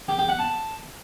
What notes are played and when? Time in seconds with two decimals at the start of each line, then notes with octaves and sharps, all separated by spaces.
0.08 G4
0.19 G4
0.29 F#5
0.39 A5